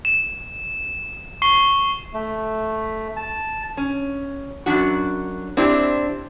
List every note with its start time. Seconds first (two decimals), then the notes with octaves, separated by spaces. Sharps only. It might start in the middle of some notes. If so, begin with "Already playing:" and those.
0.05 E7
1.42 C#6 C7 G7
2.14 A3
3.17 A5
3.77 C#4
4.66 F#2 D#3 D4 F#4
5.57 C4 D4 E4 G4